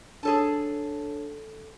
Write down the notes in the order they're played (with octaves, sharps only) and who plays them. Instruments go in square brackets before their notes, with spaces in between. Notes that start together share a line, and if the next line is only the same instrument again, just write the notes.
[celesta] D4 C#5 [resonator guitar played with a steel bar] G#4 A4 A5